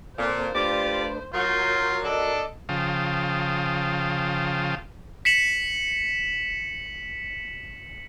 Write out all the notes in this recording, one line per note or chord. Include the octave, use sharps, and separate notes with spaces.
A#2 A#3 C4 A4 C5
A3 D4 F4 G4 B4 D5
F#3 F4 F#4 A#4 G6
D4 A4 D#5 D6
C#3 F3 F5 G5 A5 D#6
B6 C#7 E7 F#7